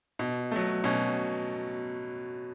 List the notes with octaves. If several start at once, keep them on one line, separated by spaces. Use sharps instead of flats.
B2
F#3 A3
B2 C#4